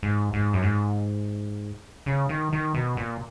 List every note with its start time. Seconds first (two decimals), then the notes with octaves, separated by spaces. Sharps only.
0.03 G#2
0.33 G#2
0.53 F#2
0.63 G#2
2.06 C#3
2.29 D#3
2.53 D#3
2.75 B2
2.97 A#2